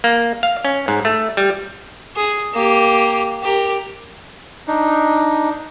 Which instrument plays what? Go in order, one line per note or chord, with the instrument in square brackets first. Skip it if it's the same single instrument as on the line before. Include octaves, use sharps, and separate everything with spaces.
[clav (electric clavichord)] A#3
F5
C#4
G#2
A3
G3
[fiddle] G#4
A#3 G4
G4 A#4
[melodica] D4 D#4